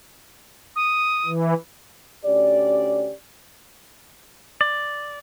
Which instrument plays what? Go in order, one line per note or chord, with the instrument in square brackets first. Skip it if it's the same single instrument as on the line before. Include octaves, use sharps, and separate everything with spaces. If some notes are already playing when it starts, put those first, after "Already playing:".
[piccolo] D#6
[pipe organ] E3
[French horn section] D2 C#4 G4 D5
[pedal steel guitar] D5